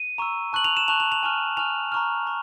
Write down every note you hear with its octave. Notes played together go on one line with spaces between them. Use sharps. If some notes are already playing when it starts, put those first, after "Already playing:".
Already playing: D#7
A#5 C#6 E6
A5 C#6 F#6 F#7
F7
E7
A5 C#6 F#6 F7
F7
F7
G#5 C#6 F6
G#5 C#6 F6 F7
A#5 C#6 F6
A#5 C#6